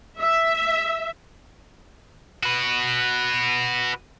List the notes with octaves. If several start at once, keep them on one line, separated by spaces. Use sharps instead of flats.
E5
F#4 B4